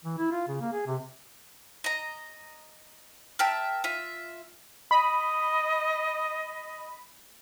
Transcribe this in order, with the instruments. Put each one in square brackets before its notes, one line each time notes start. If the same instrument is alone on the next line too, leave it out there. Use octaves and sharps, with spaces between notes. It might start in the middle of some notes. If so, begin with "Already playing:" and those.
[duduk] E3
E4
F4
C#3
A#3
G#4
C3
[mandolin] D#5 A#5
A#4 E5 G5 A5
F4 E5
[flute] D#5 [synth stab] B5